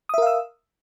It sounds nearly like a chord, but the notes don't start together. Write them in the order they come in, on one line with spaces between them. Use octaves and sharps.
D#6 E5 A#4 F5 E6